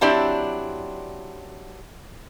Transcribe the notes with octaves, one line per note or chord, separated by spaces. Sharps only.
F#3 C4 D4 E4 G4 D5